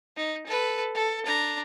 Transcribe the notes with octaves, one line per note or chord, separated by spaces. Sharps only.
D#4
A4 B4
A4
D4 A#5